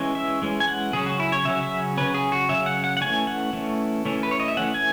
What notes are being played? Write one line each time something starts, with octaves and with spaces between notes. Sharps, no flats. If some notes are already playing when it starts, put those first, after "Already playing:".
Already playing: E3 G#3 C#4
E5
E3 G#3 C#4
G#5
F#5
C#3 F#3 C#4 G#4
F#4
E4
C#5
C#3 F#3 C#4 E5
E5
C#3 F#3 C#4 B4
G#4
F#4
C#3 F#3 C#4 E5
F#5
F#5
F#5
E3 A3 C#4 G#5
F#5
E3 A3 C#4
E3 A3 C#4
B4
C#5
D#5
E5
E3 A3 C#4 F#5
G#5